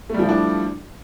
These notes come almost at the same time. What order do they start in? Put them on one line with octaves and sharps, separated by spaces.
A3 G3 F3 E4 D4